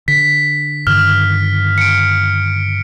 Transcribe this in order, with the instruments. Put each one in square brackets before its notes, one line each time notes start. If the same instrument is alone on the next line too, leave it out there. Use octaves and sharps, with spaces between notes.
[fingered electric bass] D3 [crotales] B6
[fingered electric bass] G2 D3 D#3 [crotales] F6
[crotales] C#7 D7